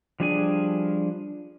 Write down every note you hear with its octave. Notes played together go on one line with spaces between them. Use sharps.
F3 G3 D4 G#4 G#5